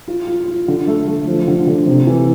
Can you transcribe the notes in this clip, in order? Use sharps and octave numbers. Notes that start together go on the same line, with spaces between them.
F4
F4
F4
D3
A3
A3
F3
D3
D3
C3
E3